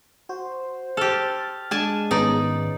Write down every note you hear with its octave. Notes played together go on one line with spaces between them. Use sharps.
F#4 C5
G4 A4 F6 A6
G#3 D4 G#5 A5
G#1 B3 C#4 D#4 D5